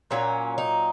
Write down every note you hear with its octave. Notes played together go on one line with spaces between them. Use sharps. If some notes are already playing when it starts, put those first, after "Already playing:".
A#2 F#3 A#3 C#4
D#4